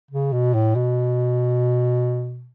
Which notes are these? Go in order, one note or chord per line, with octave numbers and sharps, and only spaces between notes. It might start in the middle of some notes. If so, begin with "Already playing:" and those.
C#3
B2
A2
B2